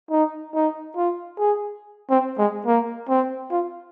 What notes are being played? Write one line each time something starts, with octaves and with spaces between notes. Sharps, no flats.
D#4
D#4
F4
G#4
C4
G#3
A#3
C4
F4